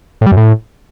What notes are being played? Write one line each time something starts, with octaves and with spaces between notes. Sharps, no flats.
A2
G3
F#2
A2